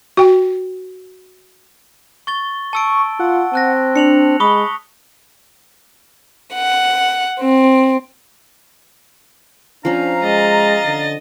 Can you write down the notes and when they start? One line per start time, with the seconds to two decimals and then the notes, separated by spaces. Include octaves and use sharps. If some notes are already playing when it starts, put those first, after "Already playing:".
0.17 F#4 G5
2.27 C#6 A6 G7
2.73 A5 C#6 E6 D7
3.19 F4 F#5
3.53 C4 A5 F#6 A#6
3.96 D4 C#7 F7 F#7
4.40 G#3 B5 C#6 D#6 G7
6.55 F#5
7.40 C4
9.85 F3 C#4 D4 F5 A#5
10.23 G#3 D#5 A6
10.86 D3